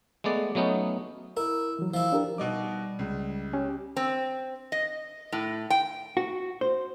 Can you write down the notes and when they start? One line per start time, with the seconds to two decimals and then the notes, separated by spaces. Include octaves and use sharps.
0.24 G#3 A3 B3 D5
0.55 F#3 A3 B3 C#4 D#4
1.37 E4 A#4
1.79 E3 F#3
1.94 E3 F3 E4
2.12 D4 G4 A#4
2.38 B2 G3 D#4 D6
2.99 C#2
3.53 C#4 G4
3.97 C4
4.72 D#5
5.32 A2
5.70 G5
6.17 F#4
6.61 C5